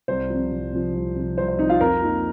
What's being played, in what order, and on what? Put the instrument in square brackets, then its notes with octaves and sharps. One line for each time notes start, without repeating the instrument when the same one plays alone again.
[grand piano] C2 C5
C3 F3
C2
C3 F3
C2
C3 F3
C2 C5
C5
C3 F3 D#4 D#5
F4 F5
F2 A#4 A#5
F3 A#3 D#4